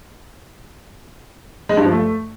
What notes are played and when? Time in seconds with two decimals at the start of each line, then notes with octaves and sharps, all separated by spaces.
1.69 G#3
1.77 G2
1.84 F3
1.92 A3